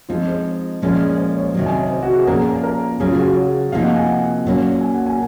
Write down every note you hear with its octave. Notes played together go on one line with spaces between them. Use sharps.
F3 G#3 C4 D#4 F4
C5
A#2 F3 G#3 C#4
C5
C#5
C3 D#3 F#3
G#5
C#5
C5
F#4
G#4
A#2 F3 A#3 C#4 A#4
A#4
C#3 F#3 C#4 G#4
F4
F#4
G#4
C#5
C3 F3 A#3 D#4 F5
F#5
G#5
A#2 F#3 A#3 C#4
G#5
F#5
G#5